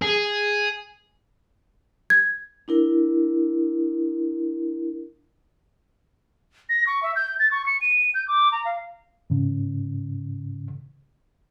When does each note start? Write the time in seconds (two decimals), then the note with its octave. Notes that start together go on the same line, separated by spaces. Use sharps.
0.02 G#4
2.10 G#6
2.68 D4 E4 A#4
6.69 A#6
6.87 C#6
7.03 E5
7.16 G6
7.40 A6
7.51 C#6
7.66 C#7
7.81 D#7
8.14 G6
8.28 D6
8.52 A#5
8.65 F5
9.30 G#2 C#3